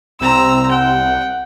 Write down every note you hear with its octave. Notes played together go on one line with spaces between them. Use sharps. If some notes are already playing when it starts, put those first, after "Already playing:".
C2 C4 A#5 E6
F#5 G5